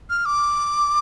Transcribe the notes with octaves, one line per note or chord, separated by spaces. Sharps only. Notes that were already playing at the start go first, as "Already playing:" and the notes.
F6
D6